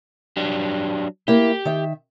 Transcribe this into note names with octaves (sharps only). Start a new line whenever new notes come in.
F#3 D4 G4
A#3 E4 G4
D#3 E5